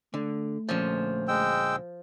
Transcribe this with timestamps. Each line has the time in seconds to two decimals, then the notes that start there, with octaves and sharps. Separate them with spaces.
0.14 D3 A3
0.69 D2 A#2 F3 C#4
1.28 G#3 G5 E6